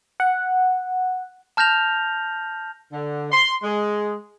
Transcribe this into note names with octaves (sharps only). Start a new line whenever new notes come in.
F#5
A5 F6 G6 A#6 F7
D3
C6
G#3